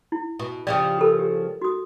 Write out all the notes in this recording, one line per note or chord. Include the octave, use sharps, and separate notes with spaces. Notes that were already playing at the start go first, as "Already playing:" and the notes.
E4
B2
C#3 F3 G3 D5
G4 A4 A#4
G4
F#4 D#6